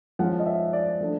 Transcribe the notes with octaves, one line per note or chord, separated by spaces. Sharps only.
F3 G#3 C#4 F#5
D#5
E5
D5
F3 A3 D4